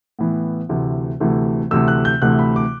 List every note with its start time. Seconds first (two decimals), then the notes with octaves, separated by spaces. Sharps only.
0.19 A2 E3 B3
0.69 D2 C3 E3 A3
1.20 D2 C3 E3 A3
1.71 D2 C3 E3 A3 E6
1.88 F#6
2.05 G6
2.22 D2 C3 E3 A3 F#6
2.39 B5
2.56 D6